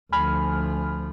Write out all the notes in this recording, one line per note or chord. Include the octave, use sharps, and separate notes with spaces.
D2 F3 G#5 B5 F6